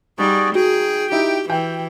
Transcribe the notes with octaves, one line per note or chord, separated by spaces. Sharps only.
G3 D#4 F#4 G#4 D5
F#4 G#4 G5
D#4 E4 G4
E3 G5